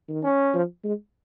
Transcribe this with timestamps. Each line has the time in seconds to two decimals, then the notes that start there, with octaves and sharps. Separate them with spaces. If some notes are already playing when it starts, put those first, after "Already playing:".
0.09 D#3
0.24 C#4
0.54 F3
0.84 G#3